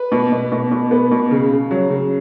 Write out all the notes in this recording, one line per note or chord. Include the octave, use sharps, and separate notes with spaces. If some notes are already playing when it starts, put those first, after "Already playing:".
Already playing: B4
B2
B2
B2
B2
B3
B2
C#3
C#3
F#3
C#3